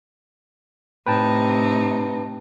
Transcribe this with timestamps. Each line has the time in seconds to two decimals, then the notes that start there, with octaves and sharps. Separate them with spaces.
1.06 A2 C3 D#4 B4 G5 A5